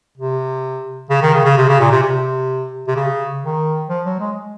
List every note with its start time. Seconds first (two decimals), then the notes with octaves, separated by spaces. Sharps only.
0.18 C3
1.10 C#3
1.22 D#3
1.34 C#3
1.45 C#3
1.57 C3
1.69 C#3
1.80 A#2
1.91 C3
2.03 C3
2.87 C3
2.96 C#3
3.43 D#3
3.89 F3
4.05 F#3
4.20 G#3